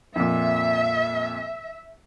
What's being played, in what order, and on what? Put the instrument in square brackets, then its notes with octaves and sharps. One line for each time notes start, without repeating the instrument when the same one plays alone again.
[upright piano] F2 A#2 [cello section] E5